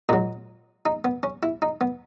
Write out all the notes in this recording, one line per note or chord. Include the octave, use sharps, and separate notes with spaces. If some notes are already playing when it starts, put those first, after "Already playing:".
A#2 F#3 D#4
D#4
B3
C#4
E4
D#4
B3